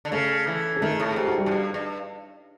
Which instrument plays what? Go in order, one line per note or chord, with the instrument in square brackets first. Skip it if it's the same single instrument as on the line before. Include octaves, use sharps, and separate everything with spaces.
[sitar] D3
[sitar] C#3 [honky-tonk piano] A3 A4
[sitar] E3
[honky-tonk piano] G#4
[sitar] D#3 [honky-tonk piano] A3 A4
[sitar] A2
[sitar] G#2 [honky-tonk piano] G4
[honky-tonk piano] F#4
G3 G4
[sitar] G#2
G2
G2